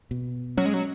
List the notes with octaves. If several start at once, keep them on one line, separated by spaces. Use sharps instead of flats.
B2
F#3 C#4
G#3
F#3